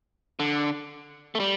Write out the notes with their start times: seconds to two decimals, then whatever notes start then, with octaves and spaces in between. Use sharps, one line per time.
0.39 D3
1.35 A3
1.40 G3